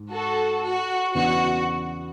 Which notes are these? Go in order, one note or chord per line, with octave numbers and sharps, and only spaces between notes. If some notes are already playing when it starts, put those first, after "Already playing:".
Already playing: G#2
F#4 A4
F#4
E2 C#3 E3 B3 D4 F#4